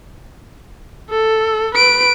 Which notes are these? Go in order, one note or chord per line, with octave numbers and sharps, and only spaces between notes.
A4
B4 D7